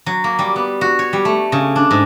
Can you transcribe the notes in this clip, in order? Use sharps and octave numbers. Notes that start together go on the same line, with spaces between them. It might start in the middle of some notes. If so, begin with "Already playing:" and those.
F#3
A#3
G3
B3
F#4
C#5
G3
A3
C#3
D4
G#2